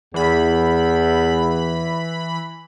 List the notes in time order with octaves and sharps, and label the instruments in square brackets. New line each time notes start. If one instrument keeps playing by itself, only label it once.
[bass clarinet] E2 [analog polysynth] E3 B5